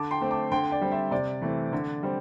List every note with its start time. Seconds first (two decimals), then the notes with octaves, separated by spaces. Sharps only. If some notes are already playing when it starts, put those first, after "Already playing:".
Already playing: D3 A5 D6
0.11 G5 C6
0.21 A3 C4
0.31 A5 D6
0.51 D3 G5 C6
0.71 D5 G5
0.81 G3 C4
0.91 C5 E5
1.11 C3 D5
1.41 E3 A3 C4
1.73 D3
2.03 G3 C4